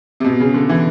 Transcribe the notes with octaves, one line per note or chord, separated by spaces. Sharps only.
C3
B2
C#3
D3
E3